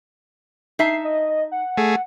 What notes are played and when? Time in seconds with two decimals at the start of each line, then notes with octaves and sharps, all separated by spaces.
0.79 D#4 E5 A5 C7
1.04 D#5
1.52 F#5
1.77 A3 G#4